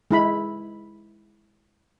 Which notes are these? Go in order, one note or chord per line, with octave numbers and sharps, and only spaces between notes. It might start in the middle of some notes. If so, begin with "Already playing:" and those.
G#3 E4 B5